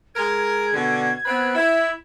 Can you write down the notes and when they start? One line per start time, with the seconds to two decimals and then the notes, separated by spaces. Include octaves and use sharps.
0.15 G#3 A#4 G#6
0.73 B2 D3
1.26 B3 C4 B4
1.55 E4